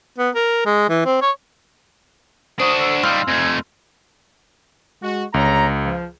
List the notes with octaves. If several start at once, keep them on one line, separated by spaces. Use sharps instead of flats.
B3
A#4
G#3
E3
C4
C#5
D4 F#4 C5 D#6
A4
D#3 G3 F5 C6 E6 F6
F2 A3 G#5
G#3 F#4
G1 C#2 C#5 A#5
F3